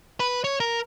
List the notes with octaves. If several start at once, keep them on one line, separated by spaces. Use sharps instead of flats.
B4
C#5
A#4